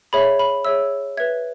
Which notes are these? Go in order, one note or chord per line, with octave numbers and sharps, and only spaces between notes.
G#4 C#5 E5 B5
B5
G#4 C#5 E5 E6
B4 E5 G#6